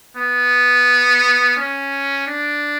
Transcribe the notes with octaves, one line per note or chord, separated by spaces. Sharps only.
B3
C#4
D4